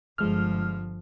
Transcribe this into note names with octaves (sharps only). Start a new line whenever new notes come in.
G1 F3 G#3 F6